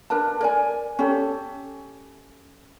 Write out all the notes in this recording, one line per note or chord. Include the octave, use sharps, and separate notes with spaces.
D4 A#4 B4 A5
A#4 D5 G#5
C#4 G4 A4